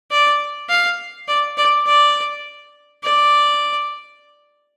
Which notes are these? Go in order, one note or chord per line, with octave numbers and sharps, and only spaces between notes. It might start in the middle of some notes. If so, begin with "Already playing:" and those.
D5
F5
D5
D5
D5
D5